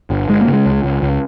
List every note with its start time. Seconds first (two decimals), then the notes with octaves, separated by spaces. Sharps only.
0.10 G1
0.29 G1 G#3
0.41 A#3
0.47 C#3
0.53 G#3
0.66 C#2
0.83 C#2
1.02 C#2